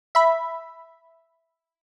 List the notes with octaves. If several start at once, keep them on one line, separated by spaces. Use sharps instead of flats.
E5 B5